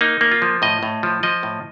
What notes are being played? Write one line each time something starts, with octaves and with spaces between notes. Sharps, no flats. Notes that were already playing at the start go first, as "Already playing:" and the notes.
A#3 D#4
A#3
F4
F3
A2 D#5
A2
F3
F3 D#5
A2